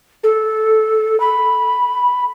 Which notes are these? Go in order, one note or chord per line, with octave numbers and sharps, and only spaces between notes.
A4
B5